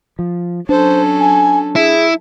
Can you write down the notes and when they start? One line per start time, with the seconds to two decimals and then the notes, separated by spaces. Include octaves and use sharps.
0.19 F3
0.69 F#3 C#4 D4 A4 C5
1.19 G#5
1.76 E4 G#4